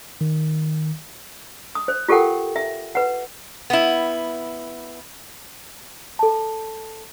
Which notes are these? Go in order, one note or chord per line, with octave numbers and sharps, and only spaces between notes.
D#3
D#6
C5
F4 G4 A4 A#4 F#5 G5
E5
B4 F#5
B3 E4
A4 A5